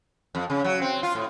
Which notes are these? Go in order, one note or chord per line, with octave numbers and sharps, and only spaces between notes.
F2
C#3
F#3
C4
F4
A2